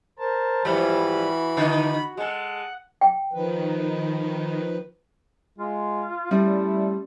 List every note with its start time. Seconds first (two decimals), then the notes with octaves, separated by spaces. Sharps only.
0.19 A#4 C5 A5
0.65 G#2 E3 F3 G3 F#4 B5
1.57 D3 D#4
2.17 G#3 A4 F#5
3.01 G5
3.33 D#3 F3 B4
5.58 G#3 F4
6.31 G3 A3 C#4 E4 G4 C6